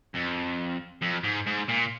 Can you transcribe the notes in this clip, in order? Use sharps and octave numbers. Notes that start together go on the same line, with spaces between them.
F2
F2
G#2
G#2
A#2